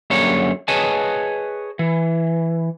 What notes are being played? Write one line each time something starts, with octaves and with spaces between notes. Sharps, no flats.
F#2 D3 G3 A#3 G#4 C#5
G#4 B4 C#5 D#5 G#5 A5
E3